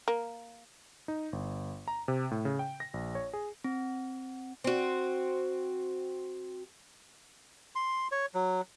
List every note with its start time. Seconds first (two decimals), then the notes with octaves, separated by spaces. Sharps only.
0.08 A#3
1.08 D#4
1.33 G1
1.88 A#5
2.08 C3
2.31 A2
2.45 C#3
2.59 G5
2.80 A#6
2.94 A#1
3.15 C#5
3.33 G#4
3.64 C4
4.64 C4 F#4
7.75 C6
8.12 C#5
8.34 F#3